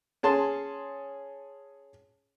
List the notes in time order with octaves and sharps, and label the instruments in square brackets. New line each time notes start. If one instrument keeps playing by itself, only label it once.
[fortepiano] C#4 G#4 A5 C6